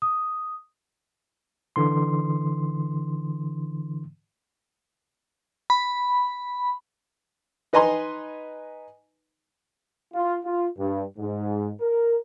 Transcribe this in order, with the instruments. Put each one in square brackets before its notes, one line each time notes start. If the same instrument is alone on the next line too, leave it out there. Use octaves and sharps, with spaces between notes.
[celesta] D#6
[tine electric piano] D3 E3 C6
[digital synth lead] B5
[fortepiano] D#4 B4 D#5 G#5 A#5 C6
[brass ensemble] F4
F4
G2
G#2
A#4